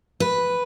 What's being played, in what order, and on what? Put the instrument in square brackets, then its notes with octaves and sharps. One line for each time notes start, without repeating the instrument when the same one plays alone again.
[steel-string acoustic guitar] B4